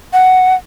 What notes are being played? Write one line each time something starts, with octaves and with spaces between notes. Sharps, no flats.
F#5